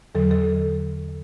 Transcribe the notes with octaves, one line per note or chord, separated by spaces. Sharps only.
E2 D3 F#3 A4
A4